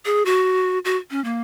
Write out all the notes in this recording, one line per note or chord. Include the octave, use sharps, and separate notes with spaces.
G#4
F#4
F#4
C#4
A#3